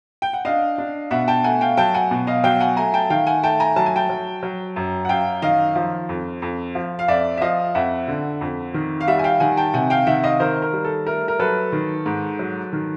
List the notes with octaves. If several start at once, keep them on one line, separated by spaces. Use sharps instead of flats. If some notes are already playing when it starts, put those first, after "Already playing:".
G5
F#5
D4 D#5 F5
D4
B2 E5 F#5
G5 A5
A3 F#5 G#5
F5 G5
F#3 G5 A5
F#5 G#5
B2
D#5 F5
F#3 F5 G5
F#5 G#5
A3 G#5 A#5
G5 A5
D#3 F5 G5
F#5 G#5
A3 G5 A5
G#5 A#5
F#3 A5
G#5
G5 A5
F#3
F#3
F#2
F#5
F#2 F5 G5
D#3 D#5 F5
F3
F2
F2
F3
F5
F2 D5 E5
E5
F3 D#5 F5
F2 E5 F#5
D3
F2
D#3
F5
G3 E5 F#5
G#5
F5 G5
D#3 F#5 G#5
G5 A5
C3 F#5 G#5
F5 G5
D#3 E5 F#5
D#5 F5
D#3 A#4 C5
A#4
G3
A4
A3 A#4
A#4
F#3 A4 B4
D#3
G#2
F#3
D#3